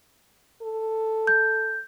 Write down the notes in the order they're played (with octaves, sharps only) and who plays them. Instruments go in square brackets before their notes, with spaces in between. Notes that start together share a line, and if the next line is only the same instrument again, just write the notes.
[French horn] A4
[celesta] G6